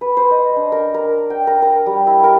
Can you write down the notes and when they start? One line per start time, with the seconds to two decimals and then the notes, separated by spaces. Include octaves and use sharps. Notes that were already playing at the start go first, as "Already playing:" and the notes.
0.01 B4
0.17 C5
0.31 D#5
0.56 D4
0.72 A#4
0.94 A#4
1.30 G5
1.47 A#4
1.62 A#4
1.86 G3
2.07 E4
2.24 A#4